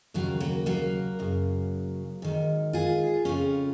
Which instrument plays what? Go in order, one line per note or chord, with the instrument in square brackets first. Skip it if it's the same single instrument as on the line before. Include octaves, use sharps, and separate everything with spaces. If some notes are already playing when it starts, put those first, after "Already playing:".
[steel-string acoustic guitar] D#2 C#3 F#3 A#3
F#3 A#3
F#3 A#3
F#2 C#3
G#2 D#3
F4 G#4
F2 C#3 C#4 F4